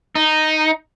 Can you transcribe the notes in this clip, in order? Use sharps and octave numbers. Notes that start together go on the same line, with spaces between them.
D#4